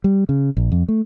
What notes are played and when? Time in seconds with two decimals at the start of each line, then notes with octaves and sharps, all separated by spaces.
0.04 G3
0.29 C#3
0.57 A#1
0.72 F2
0.88 A3